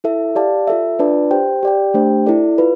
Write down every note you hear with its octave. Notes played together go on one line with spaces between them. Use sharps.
E4 A4 E5
G4 D5 F5 A5
F4 A4 E5
D4 F4 B4 D5 A5
G4 C5 G5
G4 D5 G5
A3 D4 G4 C5 G5
E4 A4 D5
F4 B4